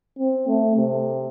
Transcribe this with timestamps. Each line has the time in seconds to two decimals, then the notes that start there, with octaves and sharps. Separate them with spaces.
0.19 C4
0.47 A3
0.76 C3